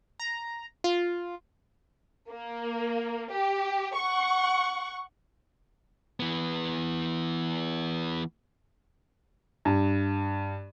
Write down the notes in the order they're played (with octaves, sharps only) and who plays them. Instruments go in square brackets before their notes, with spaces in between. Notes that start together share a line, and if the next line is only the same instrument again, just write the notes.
[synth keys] A#5
F4
[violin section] A#3
G4
F#5 C#6
[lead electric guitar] E3 B3
[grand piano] G2